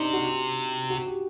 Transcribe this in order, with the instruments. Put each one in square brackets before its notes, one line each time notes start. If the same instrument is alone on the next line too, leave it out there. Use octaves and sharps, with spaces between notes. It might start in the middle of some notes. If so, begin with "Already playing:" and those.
Already playing: [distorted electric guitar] C3 [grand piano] D4 D#4
[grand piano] F#4
G4
F#4
G4